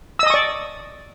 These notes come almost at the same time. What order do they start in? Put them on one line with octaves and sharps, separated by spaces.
E6 D#5 D#6 C#6 D5